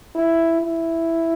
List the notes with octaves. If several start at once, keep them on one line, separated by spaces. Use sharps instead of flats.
E4
E4